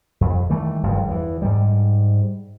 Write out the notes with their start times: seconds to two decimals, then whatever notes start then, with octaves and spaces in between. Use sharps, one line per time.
0.21 F2
0.49 D#3 E3 G3 A3
0.83 F#1 G2 D#3 F3
1.07 E2 E3
1.42 G#2 G3